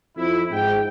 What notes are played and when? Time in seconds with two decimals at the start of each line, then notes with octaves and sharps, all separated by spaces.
0.16 F2 E4
0.51 G#2 G5